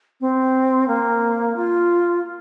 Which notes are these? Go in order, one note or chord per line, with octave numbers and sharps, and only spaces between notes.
C4
A#3
F4